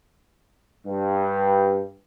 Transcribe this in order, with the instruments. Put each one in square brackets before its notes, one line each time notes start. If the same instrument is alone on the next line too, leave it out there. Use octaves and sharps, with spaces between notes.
[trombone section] G2